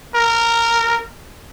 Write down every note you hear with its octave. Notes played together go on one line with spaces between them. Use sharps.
A#4